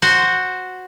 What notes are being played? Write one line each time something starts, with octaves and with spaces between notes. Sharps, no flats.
F#4 C5